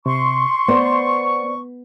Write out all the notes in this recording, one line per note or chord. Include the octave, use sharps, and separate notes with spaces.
C3 C6 C#6
B3 C5 D5